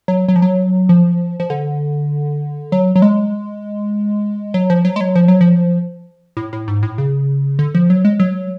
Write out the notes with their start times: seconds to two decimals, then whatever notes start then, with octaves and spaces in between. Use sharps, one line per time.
0.08 F#3
0.28 F#3
0.36 F3
0.42 F#3
0.89 F3
1.40 F3
1.50 D3
2.72 F#3
2.96 F#3
3.02 G#3
4.54 F#3
4.70 F3
4.85 F#3
4.96 G#3
5.01 F#3
5.15 F3
5.28 F#3
5.41 F3
6.37 A2
6.53 A2
6.68 G#2
6.83 A2
6.98 C#3
7.59 D3
7.75 F3
7.90 F#3
8.05 G#3
8.20 F#3